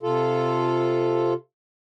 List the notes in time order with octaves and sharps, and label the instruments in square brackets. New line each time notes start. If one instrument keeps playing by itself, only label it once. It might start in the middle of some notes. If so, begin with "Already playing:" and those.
[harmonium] C3 F4 A4